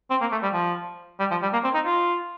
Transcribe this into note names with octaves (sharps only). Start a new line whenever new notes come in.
C4
A#3
A3
G3
F3
G3
F3
G3
A#3
C4
D#4
F4